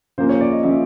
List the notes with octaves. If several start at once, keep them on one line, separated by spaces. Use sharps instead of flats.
C#3 F3 A#3 C5
C#5
D5
D#5
C#3 F3 A#3 E5